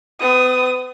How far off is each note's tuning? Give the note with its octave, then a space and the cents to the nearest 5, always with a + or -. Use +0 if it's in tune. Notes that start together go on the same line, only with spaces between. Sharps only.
B3 +40 D#6 +0